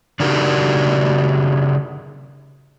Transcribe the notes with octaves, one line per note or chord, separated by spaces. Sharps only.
C#3 D4 D#4 F#4 G4 A#4